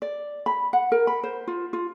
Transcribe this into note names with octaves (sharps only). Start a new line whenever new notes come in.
D5
B5
F#5
A#4
B5
C5
F4
F4